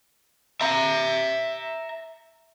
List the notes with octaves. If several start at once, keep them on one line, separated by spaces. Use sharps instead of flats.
E5 A#5